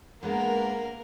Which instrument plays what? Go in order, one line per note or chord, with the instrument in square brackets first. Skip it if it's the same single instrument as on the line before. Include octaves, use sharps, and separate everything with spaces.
[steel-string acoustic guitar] G#3 B3 D4 [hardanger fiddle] A#3 A#4 [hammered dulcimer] F#5 A#5